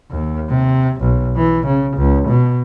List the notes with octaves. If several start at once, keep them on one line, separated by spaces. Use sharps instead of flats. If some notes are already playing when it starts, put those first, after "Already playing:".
D#2
C3
B1
E3
C#3
C#2
B2